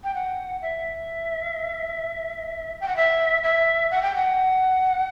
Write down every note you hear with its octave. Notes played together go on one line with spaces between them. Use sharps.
G5
F#5
E5
G5
F#5
E5
E5
F#5
G5
F#5